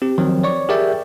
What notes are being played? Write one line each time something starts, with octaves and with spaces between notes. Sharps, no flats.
C4 G4
D#3 F3 F#3 C4
C#5 D5 C#6
G4 G#4 A#4 D5 E5 G5